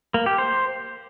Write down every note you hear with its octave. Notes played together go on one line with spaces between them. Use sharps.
A#3
G4
C5